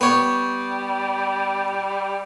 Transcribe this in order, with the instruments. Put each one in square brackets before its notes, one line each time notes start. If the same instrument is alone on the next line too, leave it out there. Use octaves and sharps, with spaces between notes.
[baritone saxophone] G3 [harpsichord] B3 C#5